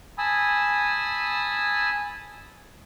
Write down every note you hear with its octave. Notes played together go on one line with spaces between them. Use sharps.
G#5 A5 B5 D#6 E6